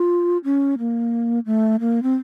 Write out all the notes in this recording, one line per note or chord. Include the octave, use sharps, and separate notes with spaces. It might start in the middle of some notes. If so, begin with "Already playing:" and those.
Already playing: F4
C#4
A#3
A3
A#3
C4